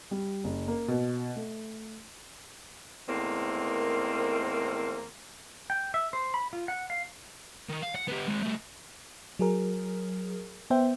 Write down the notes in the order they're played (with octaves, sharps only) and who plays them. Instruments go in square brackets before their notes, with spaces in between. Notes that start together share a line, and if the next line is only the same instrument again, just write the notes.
[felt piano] G3
F#1
A#3
B2
A3
[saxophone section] E2 A2 D#3 A#3 C4
[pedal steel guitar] G5
E5
C5
B5
F4
F#5
F5
[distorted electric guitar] D#3
F5
F#5
B3 G4
G#3 C4
G3 A3
[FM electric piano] F#3 G#4 A#4
B3 C5 E5 G5